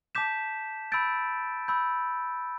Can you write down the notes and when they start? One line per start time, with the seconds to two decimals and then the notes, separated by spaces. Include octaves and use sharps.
0.15 A5 D6 G6 B6 E7
0.92 B5 E6 G6 A6 D7
1.68 B5 E6 G6